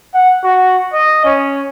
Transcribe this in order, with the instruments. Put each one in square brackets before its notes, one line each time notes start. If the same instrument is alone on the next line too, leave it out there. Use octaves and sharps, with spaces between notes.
[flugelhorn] F#5
F#4
D#5
C#4